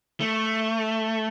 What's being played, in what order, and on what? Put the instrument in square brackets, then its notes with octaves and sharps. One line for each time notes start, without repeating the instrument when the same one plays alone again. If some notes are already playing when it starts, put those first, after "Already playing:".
[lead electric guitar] A3